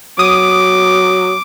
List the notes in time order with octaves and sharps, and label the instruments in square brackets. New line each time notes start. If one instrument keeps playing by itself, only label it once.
[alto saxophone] F#3 [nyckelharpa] D6 [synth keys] D#6